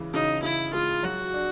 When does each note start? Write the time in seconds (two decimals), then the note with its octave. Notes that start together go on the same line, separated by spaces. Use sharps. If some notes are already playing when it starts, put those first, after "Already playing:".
Already playing: C#3 E3 G#3
0.14 C#3 D#4
0.43 C#3 E4
0.73 G#3 F4
1.03 F#3 F#4
1.34 D4